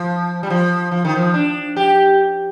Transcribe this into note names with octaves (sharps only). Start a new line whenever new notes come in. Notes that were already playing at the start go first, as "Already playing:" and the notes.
Already playing: F3
G3
F3
F3
D#3
F3
D4
G4